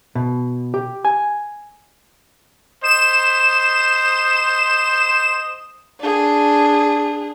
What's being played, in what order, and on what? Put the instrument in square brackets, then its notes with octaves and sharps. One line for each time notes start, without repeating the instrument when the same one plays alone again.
[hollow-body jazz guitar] B2
G4
G#5
[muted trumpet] C5 [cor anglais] D#5 [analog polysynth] E7
[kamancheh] D4 G#4